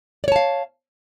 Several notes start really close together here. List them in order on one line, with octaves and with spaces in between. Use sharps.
D5 C#5 A5 F5